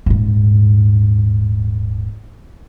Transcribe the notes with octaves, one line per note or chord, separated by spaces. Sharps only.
D#1 G#2